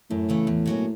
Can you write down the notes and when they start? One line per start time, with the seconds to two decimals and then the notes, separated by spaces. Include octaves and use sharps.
0.11 F#2 A2
0.29 C#3 E3 A3
0.47 E2
0.66 B2 F#3 A#3 C#4